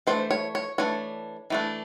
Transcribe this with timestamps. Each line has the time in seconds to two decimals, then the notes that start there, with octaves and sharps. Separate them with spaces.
0.07 E3 A3 D4 C5
0.31 C#5
0.55 C#5
0.78 E3 A3 D4 C#5
1.50 E3 A3 D4